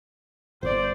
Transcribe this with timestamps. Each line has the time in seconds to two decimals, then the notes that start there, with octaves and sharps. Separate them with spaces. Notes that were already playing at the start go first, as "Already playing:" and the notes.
0.63 G1 C5 D5